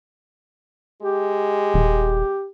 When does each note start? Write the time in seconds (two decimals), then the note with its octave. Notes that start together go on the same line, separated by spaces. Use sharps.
1.02 G#3 G4
1.74 D#1